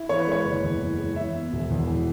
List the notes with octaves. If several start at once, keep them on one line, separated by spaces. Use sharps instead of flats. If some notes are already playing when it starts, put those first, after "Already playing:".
Already playing: E4
E3 C#5
B4
G#3 C#5
F#1
E2
E3
G#3
E3 E5
B3
E1
E2
E3